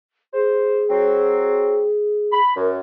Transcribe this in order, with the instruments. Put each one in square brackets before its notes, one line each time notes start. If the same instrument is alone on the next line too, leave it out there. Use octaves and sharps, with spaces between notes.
[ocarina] G#4 [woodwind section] C5
[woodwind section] F#3 C4
B5
[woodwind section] F#2 [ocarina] A#4